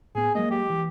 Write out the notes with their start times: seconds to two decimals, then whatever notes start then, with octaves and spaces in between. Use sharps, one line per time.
0.15 A2 B3 G#4
0.35 F#3 G#3 A#3 D#5
0.51 G4
0.70 E3